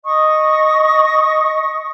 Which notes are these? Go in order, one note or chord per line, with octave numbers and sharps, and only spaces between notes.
D#5 C#6 D#6